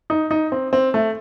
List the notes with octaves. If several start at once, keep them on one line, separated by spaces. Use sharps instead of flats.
D#4
D#4
C4
C4
A3